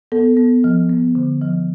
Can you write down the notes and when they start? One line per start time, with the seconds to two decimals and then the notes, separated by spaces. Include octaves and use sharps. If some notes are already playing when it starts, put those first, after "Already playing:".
0.12 B3 A4
0.37 B3
0.64 F3
0.89 B3
1.15 D3
1.41 F3